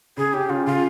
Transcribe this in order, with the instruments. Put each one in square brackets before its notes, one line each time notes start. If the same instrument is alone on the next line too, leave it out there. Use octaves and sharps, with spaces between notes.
[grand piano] C#3 [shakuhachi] G#4
[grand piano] C#4 [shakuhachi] G4
[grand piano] C#3 [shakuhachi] F4
[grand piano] C#3 [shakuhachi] F4